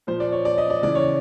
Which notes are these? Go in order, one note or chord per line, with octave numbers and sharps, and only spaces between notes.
A#2 F3 C5
D5
C#5
D5
D#5
D5
C#3 E3 D5
C#5